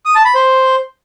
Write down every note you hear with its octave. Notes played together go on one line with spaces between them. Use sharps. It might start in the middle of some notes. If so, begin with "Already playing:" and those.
D#6
A5
B5
C5